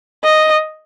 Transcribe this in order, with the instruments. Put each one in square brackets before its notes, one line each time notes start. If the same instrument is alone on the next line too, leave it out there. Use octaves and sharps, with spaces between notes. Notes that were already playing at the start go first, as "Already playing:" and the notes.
[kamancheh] D#5